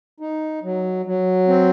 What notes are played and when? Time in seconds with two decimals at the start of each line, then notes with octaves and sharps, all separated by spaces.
0.20 D#4
0.63 F#3
1.06 F#3
1.48 C4